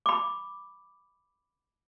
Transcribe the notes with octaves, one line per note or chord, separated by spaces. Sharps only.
B5 D6